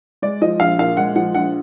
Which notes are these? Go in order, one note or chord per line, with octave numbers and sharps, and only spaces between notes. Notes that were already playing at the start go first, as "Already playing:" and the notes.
G#3 D5
F3 D#5
A#1 F5
A#2 F5
G#3 F#5
F3 F#5
A#1 F#5